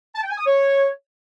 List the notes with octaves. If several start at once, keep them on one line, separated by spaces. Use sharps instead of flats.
A5
G5
G#5
D#6
C#5